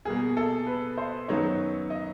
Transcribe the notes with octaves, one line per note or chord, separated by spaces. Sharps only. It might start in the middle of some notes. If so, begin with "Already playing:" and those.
B2 G3 A#3 G#4
A4
B4
C5
F#2 D#3 F#3 B3 D#4 C#5
D#5